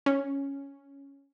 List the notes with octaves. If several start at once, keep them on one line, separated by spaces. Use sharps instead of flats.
C#4